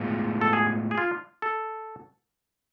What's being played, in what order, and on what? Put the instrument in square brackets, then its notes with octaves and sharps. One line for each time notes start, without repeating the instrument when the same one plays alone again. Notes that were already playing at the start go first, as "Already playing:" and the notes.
Already playing: [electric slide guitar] A2 G#3 B3 F4
[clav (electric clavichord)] A4
G#4
G#4
F4
A4